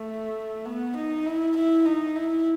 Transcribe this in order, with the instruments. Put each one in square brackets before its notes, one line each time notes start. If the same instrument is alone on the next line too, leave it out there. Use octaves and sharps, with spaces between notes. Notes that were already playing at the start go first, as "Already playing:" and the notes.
Already playing: [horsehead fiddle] A3
B3
D#4
E4
E4
D#4
E4